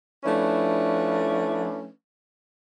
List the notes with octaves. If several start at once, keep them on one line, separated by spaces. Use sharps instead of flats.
F3 A3 C#4 D4 E4 B4